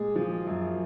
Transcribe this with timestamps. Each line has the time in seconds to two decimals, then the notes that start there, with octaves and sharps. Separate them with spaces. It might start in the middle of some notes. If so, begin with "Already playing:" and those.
Already playing: A#2 G#3 G#4
0.16 F3
0.47 F#2